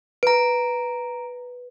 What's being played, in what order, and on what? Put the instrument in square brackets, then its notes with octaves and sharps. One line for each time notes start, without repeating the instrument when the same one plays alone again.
[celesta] B4 [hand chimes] A#5 D7